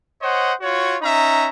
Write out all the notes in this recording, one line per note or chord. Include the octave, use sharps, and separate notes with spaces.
C5 C#5 D#5 F#5
F4 F#4 C#5
C#4 D#4 E5 A#5